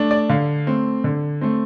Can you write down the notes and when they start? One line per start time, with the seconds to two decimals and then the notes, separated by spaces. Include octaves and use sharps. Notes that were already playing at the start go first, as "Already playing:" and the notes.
Already playing: A3 D4
0.11 D5
0.29 D3 F5
0.67 A3 C4
1.04 D3
1.41 A3 C4